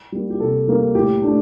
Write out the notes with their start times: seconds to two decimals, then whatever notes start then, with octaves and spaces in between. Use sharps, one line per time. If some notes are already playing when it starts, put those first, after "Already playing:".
0.12 G3 A#3
0.30 G4
0.40 C3 A4
0.68 G3 A#3
0.95 A2 G4
1.22 A3 D4